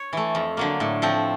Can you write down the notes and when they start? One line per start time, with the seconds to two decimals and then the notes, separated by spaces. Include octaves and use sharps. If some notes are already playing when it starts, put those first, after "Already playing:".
Already playing: C#5
0.13 E3 A3
0.35 F2
0.57 D3 F#3 A#3
0.80 A2
1.02 F3 A3 C4